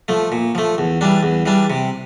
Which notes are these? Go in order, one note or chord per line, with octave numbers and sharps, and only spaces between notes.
F3 A3
A#2
F3 A3
E2
E3 G3 D4
E2
E3 G3 D4
C3